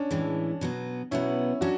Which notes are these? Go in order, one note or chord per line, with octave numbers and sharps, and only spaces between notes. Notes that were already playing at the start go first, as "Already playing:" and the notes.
Already playing: C#4 D4
A2 E3 G#3
B2 F#3 B3
B2 F#3 B3 C#4 E4
F#3 C#4 D4 F#4